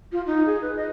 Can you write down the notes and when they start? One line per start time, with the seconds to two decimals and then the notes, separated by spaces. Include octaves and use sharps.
0.12 F4
0.26 D#4
0.46 G#4
0.62 B4
0.76 D#5